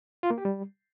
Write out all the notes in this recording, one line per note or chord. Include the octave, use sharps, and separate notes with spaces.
F4
A#3
G4
G3